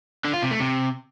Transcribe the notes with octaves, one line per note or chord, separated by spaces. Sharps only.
D3
F4
C3
A3
C3